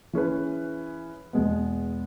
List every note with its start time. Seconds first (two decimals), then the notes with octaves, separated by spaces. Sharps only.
0.13 E3 C#4 G#4 B4
1.33 E2 B2 G#3 B3